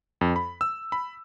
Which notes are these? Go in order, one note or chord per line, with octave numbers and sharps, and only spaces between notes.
F2
B5
E6
B5